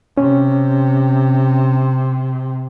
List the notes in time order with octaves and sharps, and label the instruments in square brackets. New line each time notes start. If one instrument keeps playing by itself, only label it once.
[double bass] C3 [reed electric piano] C#4